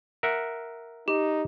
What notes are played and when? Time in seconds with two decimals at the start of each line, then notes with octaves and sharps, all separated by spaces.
0.23 A#4 E5 F#5
1.08 D#4 G4